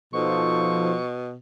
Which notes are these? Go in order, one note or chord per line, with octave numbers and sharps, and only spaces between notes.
B2 F3 D#4 A4 C5 C#6